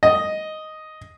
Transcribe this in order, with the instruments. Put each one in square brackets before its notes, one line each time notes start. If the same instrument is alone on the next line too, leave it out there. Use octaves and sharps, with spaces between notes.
[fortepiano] D#5